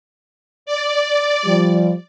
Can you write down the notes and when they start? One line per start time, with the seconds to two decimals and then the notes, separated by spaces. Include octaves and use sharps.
0.66 D5
1.44 F3 G3